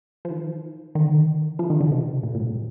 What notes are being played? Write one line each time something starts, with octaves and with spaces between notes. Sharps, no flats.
F3
D#3
D#3
D3
D#3
F3
D#3
D3
C3
A#2
A#2
A2